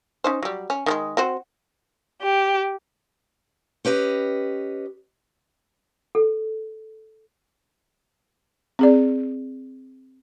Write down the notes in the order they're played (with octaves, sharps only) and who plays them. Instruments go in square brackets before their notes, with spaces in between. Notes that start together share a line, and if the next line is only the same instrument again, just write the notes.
[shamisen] C#4 D#4 C5
F#3 G3
C#4
D#3 F3 G#3
C4 F#4 C5
[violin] G4
[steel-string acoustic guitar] C#4 G4 B4 D#5
[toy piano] A4
[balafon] C4 G#4 D5